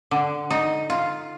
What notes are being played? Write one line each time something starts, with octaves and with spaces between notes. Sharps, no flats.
D3
D#4
F4